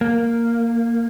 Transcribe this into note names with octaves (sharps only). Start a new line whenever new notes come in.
A#3